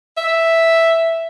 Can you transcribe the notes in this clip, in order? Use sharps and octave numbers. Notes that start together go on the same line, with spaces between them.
E5